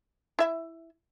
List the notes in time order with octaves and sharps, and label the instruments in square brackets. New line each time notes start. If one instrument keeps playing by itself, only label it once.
[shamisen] E4 E5